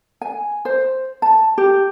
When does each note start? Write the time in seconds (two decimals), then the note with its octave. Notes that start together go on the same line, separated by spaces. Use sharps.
0.22 G#5
0.65 C5
1.22 A5
1.58 G4